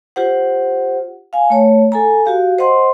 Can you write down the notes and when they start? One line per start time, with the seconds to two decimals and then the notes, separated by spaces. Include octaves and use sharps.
0.16 F4 G4 C5 F#5
1.33 F5 G#5
1.50 A3 C#5
1.92 A4 G#5 A#5
2.26 F#4 G4 F5
2.58 C5 D#5 F#5 C6